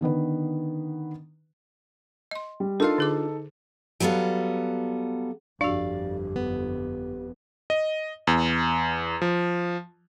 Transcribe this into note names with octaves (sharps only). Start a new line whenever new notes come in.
D3 D#3 B3 B4
D#5 C6
G3
D4 D#4 F4 A4 A#4 F5 C6
D3 G#4 D6
F#3 G3 B3 A4 F5
G1 F2 D4 F#4 G4 D5 F5
B3
D#5
E2
F3